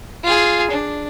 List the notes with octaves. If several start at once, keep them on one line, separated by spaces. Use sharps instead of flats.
F4 G#4
D4